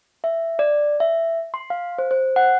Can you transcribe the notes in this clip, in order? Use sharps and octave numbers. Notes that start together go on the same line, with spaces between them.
E5
D5
E5
C6
F5
C5
C5
F#5